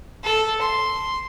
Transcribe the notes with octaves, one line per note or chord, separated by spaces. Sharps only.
A4
C6